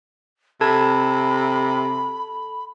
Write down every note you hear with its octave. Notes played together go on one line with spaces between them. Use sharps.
C3 A4 A5 B5 G#6